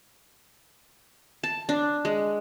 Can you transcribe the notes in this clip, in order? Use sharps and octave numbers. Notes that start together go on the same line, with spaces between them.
A5
D4
G#3